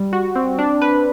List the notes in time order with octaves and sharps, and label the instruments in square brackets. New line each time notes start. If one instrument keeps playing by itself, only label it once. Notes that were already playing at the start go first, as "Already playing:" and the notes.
Already playing: [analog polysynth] G3
F#4
C4
D4
B4